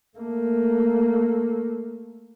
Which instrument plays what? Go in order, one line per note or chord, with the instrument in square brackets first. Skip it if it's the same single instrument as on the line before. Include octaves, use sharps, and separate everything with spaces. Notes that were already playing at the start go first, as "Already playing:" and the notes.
[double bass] A3 A#3